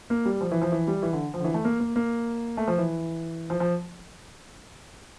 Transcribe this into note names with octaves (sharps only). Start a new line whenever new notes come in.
A#3
G3
F3
E3
F3
E3
G3
E3
D3
F3
D3
E3
A3
A#3
A#3
A#3
A3
F3
E3
F3
F3